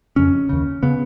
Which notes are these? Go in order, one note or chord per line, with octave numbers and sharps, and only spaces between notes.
F2 C#3 C#4
D#2 C#3
C#3 B3